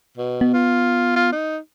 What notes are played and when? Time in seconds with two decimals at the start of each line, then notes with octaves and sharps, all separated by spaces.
0.17 B2
0.41 B3
0.54 F4
1.16 F4
1.32 D#4